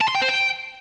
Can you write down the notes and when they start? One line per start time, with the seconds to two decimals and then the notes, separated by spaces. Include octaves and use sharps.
0.01 A5
0.08 C6
0.15 G5
0.22 C5
0.28 G5